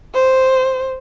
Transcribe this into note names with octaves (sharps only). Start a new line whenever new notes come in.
C5